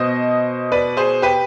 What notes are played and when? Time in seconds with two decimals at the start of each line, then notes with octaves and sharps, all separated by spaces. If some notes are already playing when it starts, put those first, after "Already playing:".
Already playing: B2 B3 C5 D#5
0.72 B4 D5
0.97 G#4 C5
1.22 G4 B4